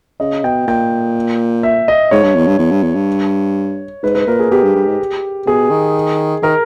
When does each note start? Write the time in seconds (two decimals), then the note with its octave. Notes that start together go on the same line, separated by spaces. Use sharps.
0.20 C#3 D#5
0.44 B2 G5
0.67 A#2 G5
1.63 E5
1.88 D#5
2.11 G#2 C#5
2.24 G2
2.35 E2
2.47 G2
2.59 E2
2.72 G2
2.83 E2
2.95 G2
4.03 G#2 B4
4.15 B4
4.27 A#2 A#4
4.40 G#4
4.51 B2 G4
4.63 G2
4.75 G2
4.87 G#2
5.46 B2 G#4
5.71 D#3
6.42 D#3 A#4